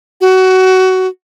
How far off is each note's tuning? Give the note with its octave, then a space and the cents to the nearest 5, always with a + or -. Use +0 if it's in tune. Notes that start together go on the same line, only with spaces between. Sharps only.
F#4 +20